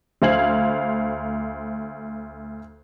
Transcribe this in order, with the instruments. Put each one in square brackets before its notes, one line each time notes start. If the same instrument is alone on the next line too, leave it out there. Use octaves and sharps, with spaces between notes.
[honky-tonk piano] D2 C5 F5 G#6 F#7